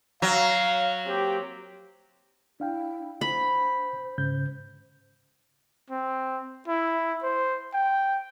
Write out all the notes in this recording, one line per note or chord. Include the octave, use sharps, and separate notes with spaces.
F#3 F5
A#3 C4 G4
D4 E4 F5 G5
C5 B5
G#2 C#3 G6
C4
E4
C5
G5